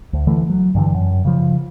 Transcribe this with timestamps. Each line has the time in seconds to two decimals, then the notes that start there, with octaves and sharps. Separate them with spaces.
0.13 D2
0.27 D3 E3 A3
0.50 F#3
0.75 G2 D3 E3
0.95 F#2
1.25 C#3 F3